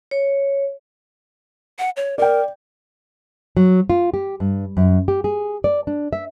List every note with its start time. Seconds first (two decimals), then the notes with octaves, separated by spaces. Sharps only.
0.11 C#5
1.79 F#5
1.97 C#5
2.18 A#4 D5 G5
3.57 F#3
3.90 F4
4.14 G4
4.40 G2
4.77 F#2
5.08 G4
5.24 G#4
5.64 D5
5.87 D4
6.13 E5